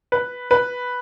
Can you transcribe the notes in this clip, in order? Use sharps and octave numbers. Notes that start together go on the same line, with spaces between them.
B4
B4